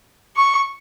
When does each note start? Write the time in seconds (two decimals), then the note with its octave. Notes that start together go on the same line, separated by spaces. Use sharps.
0.36 C#6